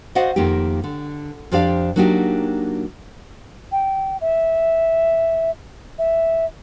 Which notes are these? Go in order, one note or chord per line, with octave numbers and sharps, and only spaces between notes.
F#4 C5 D5 D#5 F5 F#5
F2 D#3 A#3 D#4 G4
D3
F2 F3 D4 G4 D5 F5
F#3 A#3 D4 D#4 F#4 G4
G5
E5
E5